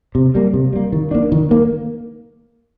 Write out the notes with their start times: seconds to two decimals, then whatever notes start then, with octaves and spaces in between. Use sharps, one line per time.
0.15 C3
0.35 G3 A#3
0.53 C3
0.73 G3 A#3
0.92 D#3
1.11 A#3 D4
1.32 D#3
1.51 A#3